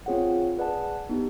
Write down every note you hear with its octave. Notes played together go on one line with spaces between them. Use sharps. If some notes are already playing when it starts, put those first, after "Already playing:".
C4 F4 G#4 C#5 F#5
G#4 B4 D5 F#5 A5
B3 D#4 G4